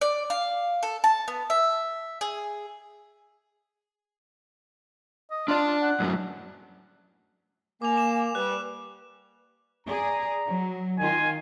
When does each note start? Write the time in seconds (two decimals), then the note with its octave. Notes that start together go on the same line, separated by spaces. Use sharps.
0.01 D5
0.30 F5
0.83 A4
1.04 A5
1.28 B3
1.50 E5
2.21 G#4
5.31 D#5
5.48 D4 F4 D5
5.66 F4
5.82 F#5
6.00 F#2 A2 F#3
7.82 A#3 G#5 D6 F7
7.96 D6 E7
8.35 G3 B4 F#6
9.87 G#4 D5 A#5
10.46 F#3
10.99 D#3 F4 G#5